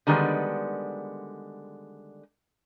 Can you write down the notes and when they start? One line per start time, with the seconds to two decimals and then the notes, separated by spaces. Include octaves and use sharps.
0.07 D3 D#3 G3 G#3 B3